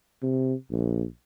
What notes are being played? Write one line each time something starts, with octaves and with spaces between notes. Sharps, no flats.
C3
A#1